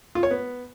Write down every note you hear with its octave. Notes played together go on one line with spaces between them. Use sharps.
F4
C#5
B3